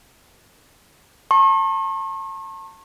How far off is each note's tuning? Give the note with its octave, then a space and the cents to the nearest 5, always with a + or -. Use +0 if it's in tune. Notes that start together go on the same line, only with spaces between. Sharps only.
A5 +30 C#6 -40